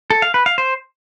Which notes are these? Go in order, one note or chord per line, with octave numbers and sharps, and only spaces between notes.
A4
F5
B4
F5
C5